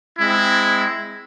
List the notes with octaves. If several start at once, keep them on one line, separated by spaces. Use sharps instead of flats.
G#3 C4 E4